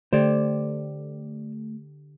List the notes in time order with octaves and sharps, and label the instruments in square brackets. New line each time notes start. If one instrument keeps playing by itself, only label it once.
[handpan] D3 G4 [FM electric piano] A3 [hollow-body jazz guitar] C5 D5